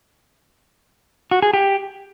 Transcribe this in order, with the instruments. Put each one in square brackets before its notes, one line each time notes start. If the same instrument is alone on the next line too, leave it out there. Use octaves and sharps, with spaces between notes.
[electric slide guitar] F#4
G#4
G4